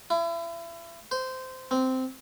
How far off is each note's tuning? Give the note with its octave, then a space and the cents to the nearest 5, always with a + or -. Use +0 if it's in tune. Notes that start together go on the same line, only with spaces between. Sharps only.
E4 +35
C5 -15
C4 -10